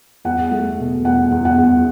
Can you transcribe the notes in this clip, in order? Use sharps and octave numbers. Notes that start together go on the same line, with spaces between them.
E2 F#5
A3
B2
E2 F#5
E2
F#5
E2